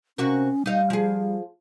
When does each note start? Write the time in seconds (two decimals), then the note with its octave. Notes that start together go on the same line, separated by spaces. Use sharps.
0.18 C3 C#4 F#4 A#4
0.66 G3 D#4 F5
0.90 F3 G#4